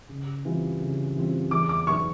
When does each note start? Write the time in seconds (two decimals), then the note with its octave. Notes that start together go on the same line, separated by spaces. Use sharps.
0.09 C#3
0.45 E3 G3 C4 F4
0.80 C#3
1.16 E3 G3 C4 F4
1.51 E2 D6
1.69 D6
1.87 B2 F#3 B3 D#4 C#6